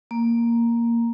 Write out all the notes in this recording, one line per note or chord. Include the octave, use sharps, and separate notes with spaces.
A#3